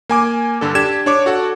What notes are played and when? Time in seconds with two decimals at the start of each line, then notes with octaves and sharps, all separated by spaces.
0.09 A#3 G#5 D6
0.61 G2 D3 A4
0.75 D4 G4 G#6 E7
1.06 D4 C#5 D6
1.26 F#4 A4 F#5